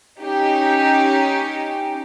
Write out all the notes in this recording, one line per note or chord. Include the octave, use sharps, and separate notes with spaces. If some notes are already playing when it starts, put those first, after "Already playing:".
C#4 D#4 G4